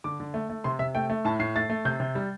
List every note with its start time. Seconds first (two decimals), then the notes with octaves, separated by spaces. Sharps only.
0.04 D3 D6
0.20 D3
0.34 A3
0.50 A3
0.64 C3 C6
0.79 C3 E5
0.95 A3 G5
1.10 A3
1.25 A2 A5
1.39 A2 C7
1.56 A3 A6
1.70 A3
1.85 C3 G6
2.00 C3
2.15 G3